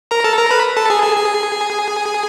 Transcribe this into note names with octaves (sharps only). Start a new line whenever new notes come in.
A#4 A#5
A4 A5
A#4 A#5
B4 B5
A4 A5
G#4 G#5
G#4 G#5
G#4 G#5